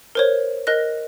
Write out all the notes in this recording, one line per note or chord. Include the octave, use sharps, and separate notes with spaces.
A#4 C5 C#5
A#4 D#5 F#6 A#6